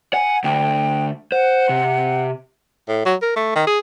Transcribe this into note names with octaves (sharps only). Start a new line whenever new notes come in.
F#5 G#5
D2 G5
C5 F#5
C3
A2
F#3
A#4
A3
D#3
G#4